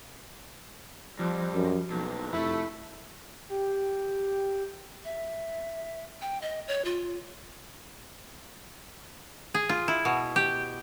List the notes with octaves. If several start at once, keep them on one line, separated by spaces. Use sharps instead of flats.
F2 F3 G3
F#2
B1 G2 A#2
F1 F2 A3 E4
G4
E5
G5
D#5
C#5
F4
G#4
F4
E4
B2
G4